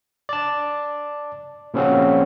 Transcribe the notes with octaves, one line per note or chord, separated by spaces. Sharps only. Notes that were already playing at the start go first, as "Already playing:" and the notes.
D5 A5
A#2 C#3 F3 C4 C#4 F#4